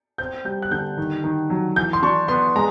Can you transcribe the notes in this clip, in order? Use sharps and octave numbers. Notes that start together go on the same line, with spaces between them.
C4 G6
G3 G6
F#6
D3 G6
D#3
D#3
F#3
E3 G6
C6
D4 C#6
B3 C6
G#3 A#5